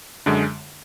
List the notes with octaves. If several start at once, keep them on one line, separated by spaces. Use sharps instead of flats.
F#2 D3 G#3